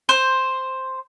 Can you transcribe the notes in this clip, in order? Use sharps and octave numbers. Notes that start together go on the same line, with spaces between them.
C5